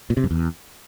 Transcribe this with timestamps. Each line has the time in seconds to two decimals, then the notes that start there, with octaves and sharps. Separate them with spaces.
0.10 A#2
0.17 C3
0.24 F#2
0.31 E2